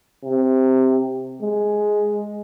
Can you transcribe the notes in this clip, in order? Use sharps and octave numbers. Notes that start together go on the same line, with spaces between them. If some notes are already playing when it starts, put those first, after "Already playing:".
C3
G#3